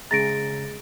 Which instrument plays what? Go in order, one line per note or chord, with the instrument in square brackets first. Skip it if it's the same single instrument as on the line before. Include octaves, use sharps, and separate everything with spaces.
[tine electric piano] C#3 A#5 [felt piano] G#3 [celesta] A6 A#6 D7